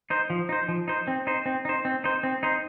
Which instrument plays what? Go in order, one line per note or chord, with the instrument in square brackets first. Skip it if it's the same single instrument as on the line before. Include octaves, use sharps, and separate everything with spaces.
[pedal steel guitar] D#4 C5
F3
D#4 C5
F3
D#4 C5
C4
D#4 C5
C4
D#4 C5
C4
D#4 C5
C4
D#4 C5